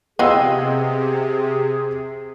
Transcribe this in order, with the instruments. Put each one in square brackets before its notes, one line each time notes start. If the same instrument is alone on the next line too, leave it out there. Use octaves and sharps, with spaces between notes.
[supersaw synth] C3 [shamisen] B3 F4 [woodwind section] G#4 [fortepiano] D#5 G5 E6